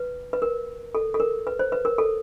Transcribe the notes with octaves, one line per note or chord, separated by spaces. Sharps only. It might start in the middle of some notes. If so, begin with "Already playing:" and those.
Already playing: B4
B4
A#4
A4
A4
A#4
B4
C5
B4
A#4
A4